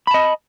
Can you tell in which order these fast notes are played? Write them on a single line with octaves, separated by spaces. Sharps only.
B5 A5 D#5